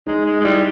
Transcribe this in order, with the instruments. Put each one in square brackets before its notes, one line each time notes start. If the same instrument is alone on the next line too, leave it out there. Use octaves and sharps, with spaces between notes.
[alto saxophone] G#3 [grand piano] D#4
[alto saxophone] G#3
G#3
[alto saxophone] G3 [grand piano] E4